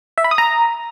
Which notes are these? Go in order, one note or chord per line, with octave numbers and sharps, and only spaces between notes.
E5
B5
D#6
A#5